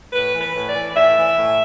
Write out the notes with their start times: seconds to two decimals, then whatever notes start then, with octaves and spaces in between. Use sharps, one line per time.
0.13 A2 B4
0.33 E3
0.41 B4
0.54 A2
0.69 D5
0.75 E3
0.95 A2 E5
1.17 E3
1.37 A2